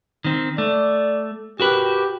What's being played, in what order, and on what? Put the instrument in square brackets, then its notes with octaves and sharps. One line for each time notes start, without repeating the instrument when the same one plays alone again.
[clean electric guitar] D#3 C4
[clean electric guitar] A3 [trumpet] D5
[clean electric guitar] F#4 A#4 B4 [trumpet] G4